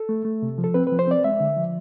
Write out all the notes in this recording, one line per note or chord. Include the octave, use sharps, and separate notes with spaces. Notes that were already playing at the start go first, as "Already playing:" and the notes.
Already playing: A4
A3
A3
C3
F3
A4
C4 B4
F3 B4
C5
C4 D5
G#3 E5
D3
F3